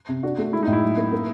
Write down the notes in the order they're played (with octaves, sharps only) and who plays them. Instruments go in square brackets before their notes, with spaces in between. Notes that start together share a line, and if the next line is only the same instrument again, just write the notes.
[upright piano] C3
[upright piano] D4 [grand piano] F#4
[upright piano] A3
[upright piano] G#3 [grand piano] E4
[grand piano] D#4
[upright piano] A2
[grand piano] E4
[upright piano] F#3
A#3
A#3